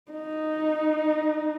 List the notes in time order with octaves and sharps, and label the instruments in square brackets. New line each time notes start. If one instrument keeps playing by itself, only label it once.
[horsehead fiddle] D#4